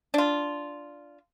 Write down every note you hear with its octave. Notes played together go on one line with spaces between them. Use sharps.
D4 F4